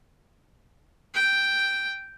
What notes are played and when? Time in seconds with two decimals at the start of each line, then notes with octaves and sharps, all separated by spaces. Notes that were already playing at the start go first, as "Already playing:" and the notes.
1.14 G5